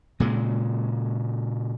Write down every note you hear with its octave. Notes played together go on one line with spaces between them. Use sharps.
A#2 C#3 G#3